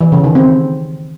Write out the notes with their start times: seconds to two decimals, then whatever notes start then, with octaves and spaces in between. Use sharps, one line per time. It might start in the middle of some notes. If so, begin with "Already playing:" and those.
0.01 E3
0.12 C#3
0.24 D#3
0.35 C4